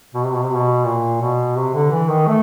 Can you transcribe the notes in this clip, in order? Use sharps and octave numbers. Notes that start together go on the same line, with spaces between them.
B2
C3
B2
C3
B2
A#2
B2
C3
D3
E3
D#3
A3